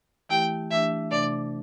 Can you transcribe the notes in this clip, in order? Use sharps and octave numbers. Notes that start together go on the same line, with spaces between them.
E3 A3 E4 G4 G5
E3 A3 D4 G4 E5
C3 A3 D4 D5